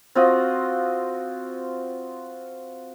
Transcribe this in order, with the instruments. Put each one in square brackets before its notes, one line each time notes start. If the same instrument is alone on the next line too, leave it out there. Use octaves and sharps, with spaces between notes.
[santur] C4 F4 F#4 D#5